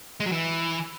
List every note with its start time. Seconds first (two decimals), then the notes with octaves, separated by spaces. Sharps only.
0.20 G#3
0.26 F#3
0.32 E3